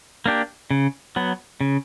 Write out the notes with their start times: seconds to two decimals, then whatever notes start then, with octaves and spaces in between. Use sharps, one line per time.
0.26 A#3 D4 G4
0.71 C#3
1.16 F#3 B3
1.61 C#3